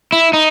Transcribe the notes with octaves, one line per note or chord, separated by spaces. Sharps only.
E4
D#4